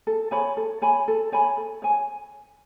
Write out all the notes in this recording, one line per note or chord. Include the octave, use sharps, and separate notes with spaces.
A4
C#5 G#5 B5
A4
C#5 G#5 B5
A4
C#5 G#5 B5
A4
C#5 G#5